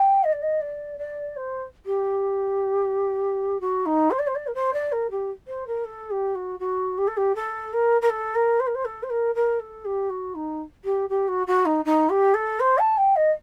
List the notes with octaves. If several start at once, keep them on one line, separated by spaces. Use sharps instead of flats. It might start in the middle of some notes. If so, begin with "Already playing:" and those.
Already playing: G5
D#5
D5
D#5
D5
D5
C5
G4
F#4
D#4
C5
D5
C5
D5
A#4
C5
D5
A#4
G4
C5
A#4
A4
G4
F#4
F#4
G4
A4
G4
A4
A#4
A#4
A4
A#4
C5
A#4
C5
A4
C5
A#4
A#4
A4
G4
F#4
D#4
G4
G4
F#4
F#4
D#4
D#4
G4
A4
C5
A5
G5
D#5